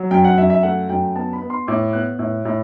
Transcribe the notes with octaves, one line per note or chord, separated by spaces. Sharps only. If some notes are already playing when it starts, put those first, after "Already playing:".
Already playing: F#3
F#2 G5
F#5
F#2 E5
E5
A3 F#5
F#2 G5
B3 A5
B5
B3
C6
A2 D6
B3 F#6
A2
A2